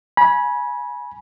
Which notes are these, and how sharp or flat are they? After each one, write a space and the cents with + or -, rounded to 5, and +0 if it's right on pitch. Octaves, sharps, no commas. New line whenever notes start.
G#5 +10 B5 -25